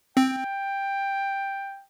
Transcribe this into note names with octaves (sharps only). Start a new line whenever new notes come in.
C4 G5